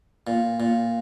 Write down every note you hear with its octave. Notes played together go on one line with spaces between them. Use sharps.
A#2
A#2